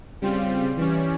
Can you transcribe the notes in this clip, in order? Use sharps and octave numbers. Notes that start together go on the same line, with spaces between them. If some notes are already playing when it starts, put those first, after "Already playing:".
C#3 G3 C4 F4
E3 G3 C#4